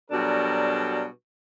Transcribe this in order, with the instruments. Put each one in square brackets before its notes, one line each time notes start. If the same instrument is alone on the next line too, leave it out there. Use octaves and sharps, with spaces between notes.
[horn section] B2 F#3 G3 D4 A4 A#4